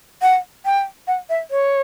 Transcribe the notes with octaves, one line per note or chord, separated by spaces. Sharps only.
F#5
G5
F#5
E5
C#5